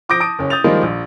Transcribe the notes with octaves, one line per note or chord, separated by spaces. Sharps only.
F3 D6 D#6 G6 A#6 D7
A5 D#6 D7
F#1 C#4
D#6 G6 A6 F7
D#3 F3 G3 G#3 A#3
A#1